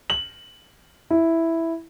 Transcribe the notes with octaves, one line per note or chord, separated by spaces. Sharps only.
F#7
E4